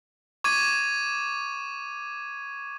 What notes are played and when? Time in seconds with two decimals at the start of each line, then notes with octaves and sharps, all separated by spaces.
0.44 C#6 D6 G#6 D#7